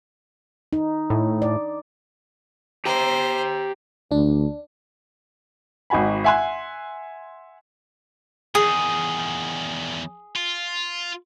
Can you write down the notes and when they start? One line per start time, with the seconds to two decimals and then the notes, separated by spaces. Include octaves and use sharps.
0.73 D#4
1.10 A2
1.42 D5
2.86 G4 C5 G5 A#5
4.11 D2 D4
5.90 G#1 D#4 F#4 G#5 B5
6.24 E5 F#5 G#5 C6 F#6
8.55 E2 D#3 G#4
10.36 F4